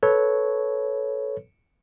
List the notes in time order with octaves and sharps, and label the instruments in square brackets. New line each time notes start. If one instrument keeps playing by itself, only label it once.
[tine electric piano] A4 B4 C#5